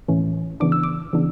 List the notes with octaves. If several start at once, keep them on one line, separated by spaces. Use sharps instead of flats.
A2 E3 A3 C#4
C#3 E3 B3 D4 D6
E6
D6
C#3 E3 B3 D4